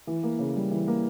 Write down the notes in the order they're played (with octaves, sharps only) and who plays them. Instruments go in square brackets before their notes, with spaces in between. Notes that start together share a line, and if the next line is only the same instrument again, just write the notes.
[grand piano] E3
A#3
C#3
G3
E3
A#3